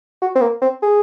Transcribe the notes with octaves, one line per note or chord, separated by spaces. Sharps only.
F#4
C4
A#3
C4
G#4